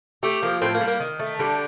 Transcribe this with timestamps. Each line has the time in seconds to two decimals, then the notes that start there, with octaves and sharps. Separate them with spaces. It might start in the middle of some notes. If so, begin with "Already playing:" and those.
0.23 A3 G4
0.42 F3 A#3
0.62 A2 C4
0.74 A#3
0.81 G3
0.87 A#3
1.00 D#3
1.19 A3
1.39 D3 G3